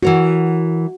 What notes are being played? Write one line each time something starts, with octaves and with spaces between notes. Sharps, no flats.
E3 F#4 A#4 C#5